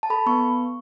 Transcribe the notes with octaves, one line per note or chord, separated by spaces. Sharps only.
A5
A4 B5
B3 C#6